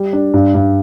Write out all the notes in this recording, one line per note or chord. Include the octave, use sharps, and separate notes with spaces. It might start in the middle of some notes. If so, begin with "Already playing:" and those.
Already playing: G3
D4
G2
G2